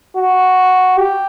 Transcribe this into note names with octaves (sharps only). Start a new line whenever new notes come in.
F#4
G4